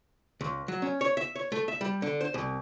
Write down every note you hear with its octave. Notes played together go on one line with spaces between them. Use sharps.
C#2
F#3
C#4
C#5
E5
C#5
A3
E5
G3
D3
C5
C2